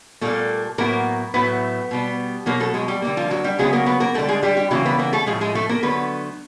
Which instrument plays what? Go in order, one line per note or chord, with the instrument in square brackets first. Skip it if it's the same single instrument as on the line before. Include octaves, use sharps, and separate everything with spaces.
[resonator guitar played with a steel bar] A#2 G3 A3 A#3 A4
A2 F#3 A#3 B3 A#4
A2 F#3 A3 B3 B4
B2 G3 B3
B2 F#3 A3 A#3 A#4
A3 A4
G#3 G#4
G3 G4
D3 G3 A#3
F3 F4
F#3 F#4
G3 G4
C#3 F#3 G#3 B3 G#4
A#3 A#4
B3 B4
A#3 A#4
D3 G3 A3 A#3 A4
G#3 G#4
G3 G4
G3 G4
C#3 E3 F#3 G3 A#3 F#4
B3 B4
A#3 A#4
A3 A4
A2 F3 G#3 G#4
G#3 G#4
A3 A4
A#3 A#4
D3 F#3 A3 B3 B4